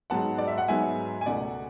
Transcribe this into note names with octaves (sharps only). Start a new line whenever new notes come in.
G#2 F#3 B3 F#5 A5
D5
E5
F#5
G#2 F#3 B3 E5 G#5
G#5
C#2 B2 A3 D5 F#5